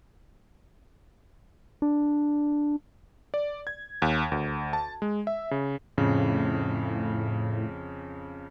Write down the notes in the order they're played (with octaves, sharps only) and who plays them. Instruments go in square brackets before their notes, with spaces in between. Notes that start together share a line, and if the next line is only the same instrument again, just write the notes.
[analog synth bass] D4
[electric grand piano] D5
G#6
D#2
D2
A5
G#3
E5
C#3
[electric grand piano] F2 C#3 [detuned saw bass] A2